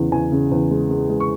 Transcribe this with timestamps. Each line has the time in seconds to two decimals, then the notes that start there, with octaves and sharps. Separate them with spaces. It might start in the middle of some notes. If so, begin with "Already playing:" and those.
Already playing: E2 C#3
0.12 E2 G#5
0.32 C#3
0.52 E2
0.71 G#3
0.90 G#3
1.10 G#3
1.20 C#6